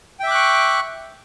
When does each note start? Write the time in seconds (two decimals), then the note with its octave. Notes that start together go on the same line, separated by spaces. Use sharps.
0.20 G5
0.23 E5
0.27 D6
0.31 F#6
0.35 C#6